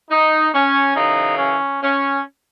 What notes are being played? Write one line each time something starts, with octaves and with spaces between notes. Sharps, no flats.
D#4
C#4
F#2 C#3 E3 D#4
C#4
C#4